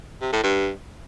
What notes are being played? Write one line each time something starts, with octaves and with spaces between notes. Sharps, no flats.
C3
A2
G2